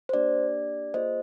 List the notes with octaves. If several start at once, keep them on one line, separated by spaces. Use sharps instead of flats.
C5
A#3 D4 G4 D5
A#3 F4 G#4 C5 D#5